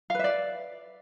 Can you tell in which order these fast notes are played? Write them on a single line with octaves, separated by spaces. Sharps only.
F5 B4 E5 D5